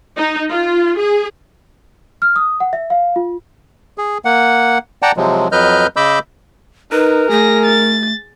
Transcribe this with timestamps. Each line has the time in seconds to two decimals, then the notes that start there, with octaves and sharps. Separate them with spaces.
0.17 D#4
0.50 F4
0.98 G#4
2.22 F6
2.36 D#6
2.60 F#5
2.73 E5
2.90 F5
3.16 F4
3.98 G#4
4.25 A#3 F#5
5.02 D5 F#5 G5 A5 A#5
5.17 C3 F3 F#3 G#3
5.52 F2 F#3 B4 D#5 F6 G6
5.96 C#3 D#5 B5 D6 E6 G6
6.92 D#4 A#4 B4
7.31 A3 G#4 A#6
7.66 A6